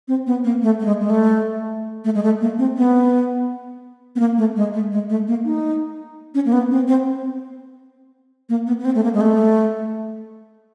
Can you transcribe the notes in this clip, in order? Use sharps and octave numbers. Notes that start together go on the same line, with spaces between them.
C4
B3
A#3
A3
A3
G#3
G#3
A3
A3
G#3
A3
A#3
C4
B3
B3
A#3
A3
G#3
A3
G#3
A3
A#3
D#4
C#4
A#3
B3
C4
C4
A#3
B3
B3
C4
A3
A#3
G#3
A3